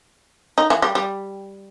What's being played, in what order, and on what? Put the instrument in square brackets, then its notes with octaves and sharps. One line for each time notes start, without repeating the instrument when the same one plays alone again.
[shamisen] D#4
E3
G3
G3